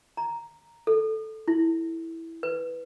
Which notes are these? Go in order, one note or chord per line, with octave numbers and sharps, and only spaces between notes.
A#5
A4
E4
B4